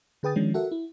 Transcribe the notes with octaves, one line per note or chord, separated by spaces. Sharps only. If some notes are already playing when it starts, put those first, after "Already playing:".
D3 G#4 B4 G5 D#6 A6
D#3 F3 G#3 C#4 D4
F#4 A4 A#4 E5 F#5
E4